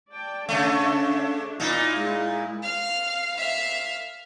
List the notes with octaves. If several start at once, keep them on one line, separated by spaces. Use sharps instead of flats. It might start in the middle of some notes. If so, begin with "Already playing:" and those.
D5 G5 A5
C#3 A3 D4 C#5 E5
A#2 D#4 E4
G#3 E4
F5
E5 F5